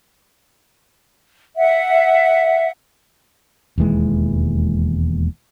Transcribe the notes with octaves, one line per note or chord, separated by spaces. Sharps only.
E5 F#5
E1 D#2 E3 G#3